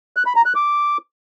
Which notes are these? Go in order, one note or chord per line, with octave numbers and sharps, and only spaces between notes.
F#6
B5
A#5
F#6
D6